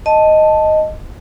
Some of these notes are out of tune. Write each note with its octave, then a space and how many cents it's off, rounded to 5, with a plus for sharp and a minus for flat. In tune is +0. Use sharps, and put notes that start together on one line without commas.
D#5 +0 A5 +0